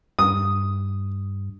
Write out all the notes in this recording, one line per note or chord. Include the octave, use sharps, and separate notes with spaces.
G2 D#6